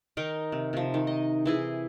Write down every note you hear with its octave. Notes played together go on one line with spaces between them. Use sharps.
D#3 D#4 A#4
C3
C3 F3
D#3
D#5
E3 E4 G#4